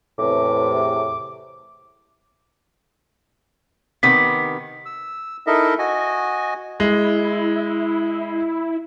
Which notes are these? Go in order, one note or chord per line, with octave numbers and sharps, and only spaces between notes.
E2 A2 C3 D6
C3 D#3 B3 B6
E6
D#4 E4 A4 A#4 D#5 E5
F#4 D#5 G#5
G#3 E4